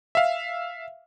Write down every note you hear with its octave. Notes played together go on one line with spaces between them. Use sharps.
E5 F5